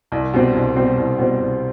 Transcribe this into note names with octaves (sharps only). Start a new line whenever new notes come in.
C2
B2 G3 C4
C2
B2 G3 C4
C2
B2 G3 C4
C2